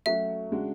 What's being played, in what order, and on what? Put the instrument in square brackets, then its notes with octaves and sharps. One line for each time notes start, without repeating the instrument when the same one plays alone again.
[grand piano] F#3 A3 C#4 F#4 [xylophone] E5
[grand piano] C#3 G#3 D4 F#4